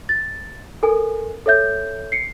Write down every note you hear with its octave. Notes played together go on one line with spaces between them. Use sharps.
A6
A4 A#4 G#5
A4 C#5 E5 G6
C7 C#7